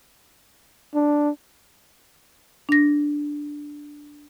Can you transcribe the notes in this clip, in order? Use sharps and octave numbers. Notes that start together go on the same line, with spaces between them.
D4
D4 A#6